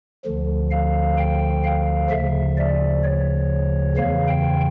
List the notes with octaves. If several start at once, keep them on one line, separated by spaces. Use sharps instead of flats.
D2 D3 F3
F5
G5
F5
D2 C#3 F3 E5
D5
C#5
E2 C#3 E3 F5
G5